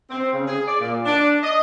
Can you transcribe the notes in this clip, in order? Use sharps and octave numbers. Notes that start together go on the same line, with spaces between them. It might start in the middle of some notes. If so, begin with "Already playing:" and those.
C4
C#3
G#4
D5
A#2
D4
D#5